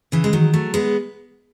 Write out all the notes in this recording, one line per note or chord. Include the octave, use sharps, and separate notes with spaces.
C#3 E3
G#3
D#3 F#3
F#3 A3
G#3 B3